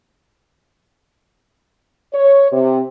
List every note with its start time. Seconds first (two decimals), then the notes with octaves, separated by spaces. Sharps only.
2.14 C#5
2.52 C3